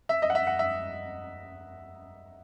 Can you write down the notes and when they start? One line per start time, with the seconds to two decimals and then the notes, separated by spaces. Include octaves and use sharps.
0.09 E5
0.22 D#5
0.30 F#5
0.35 E5
0.47 F#5
0.59 E5